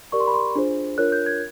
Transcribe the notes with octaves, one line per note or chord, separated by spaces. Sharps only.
G4 A#4 D5 C#6
C6
B5
C6
D4 F4 G#4 C5
D4 F4 A#4 C#5 F#6
G6
G#6